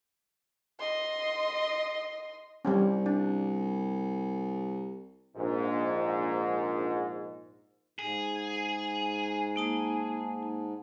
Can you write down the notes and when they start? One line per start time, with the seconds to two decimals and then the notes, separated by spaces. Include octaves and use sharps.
0.79 D#5 C6
2.65 C2 G3 C4 C#4
3.06 D4
5.36 A#1 G#2
7.99 G#2 G#4
9.56 A#3 D#4 A5